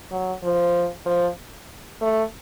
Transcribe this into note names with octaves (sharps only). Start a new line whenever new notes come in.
F#3
F3
F3
A3